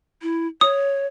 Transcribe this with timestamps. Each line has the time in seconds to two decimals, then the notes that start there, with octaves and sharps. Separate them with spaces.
0.22 E4
0.61 C#5 D#6